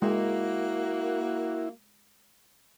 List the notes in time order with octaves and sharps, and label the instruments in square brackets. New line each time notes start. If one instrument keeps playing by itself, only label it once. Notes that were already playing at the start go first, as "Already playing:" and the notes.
[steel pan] G#3 [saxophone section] A#3 F#4 [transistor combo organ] E4